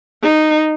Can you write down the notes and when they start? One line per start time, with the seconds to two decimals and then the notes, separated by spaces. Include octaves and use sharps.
0.23 D#4